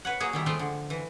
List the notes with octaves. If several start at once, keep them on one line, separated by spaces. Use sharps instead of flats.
B4 C#5 F#5
F#3 A#3 F#4 G#4
D#3 G3 E4
F3 G#3 A3 F4 G5
D3
E3